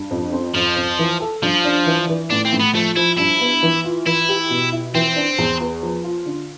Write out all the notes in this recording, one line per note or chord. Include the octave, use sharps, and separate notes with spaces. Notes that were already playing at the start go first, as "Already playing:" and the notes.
Already playing: G2
F2
C4
F2 F3
F2
E3
A4
G2 F3
D4
E3
E3
A2 D4
C4
A2
B3
F3 A3
F3 E4
G2 E4
B3
E3
F4
E3 E4
G4
B2
E4
E3 C4
D4
E2
B3
F3
F4
D3